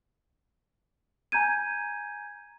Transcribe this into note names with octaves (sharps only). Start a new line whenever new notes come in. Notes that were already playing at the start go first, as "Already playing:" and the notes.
G#5 A#5 G6 G#6 D#7